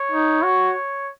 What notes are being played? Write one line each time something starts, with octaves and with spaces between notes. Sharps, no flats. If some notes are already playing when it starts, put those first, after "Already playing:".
Already playing: C#5
D#4
F#4